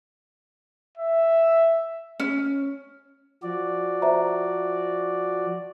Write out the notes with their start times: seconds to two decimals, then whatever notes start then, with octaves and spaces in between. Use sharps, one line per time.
0.98 E5
2.20 C#4
3.43 F3 F#4 D5
4.02 C5 E5 A#5